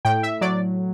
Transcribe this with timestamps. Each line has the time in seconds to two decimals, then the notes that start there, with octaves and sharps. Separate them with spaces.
0.05 A2 G5
0.23 E5
0.41 F#3 D5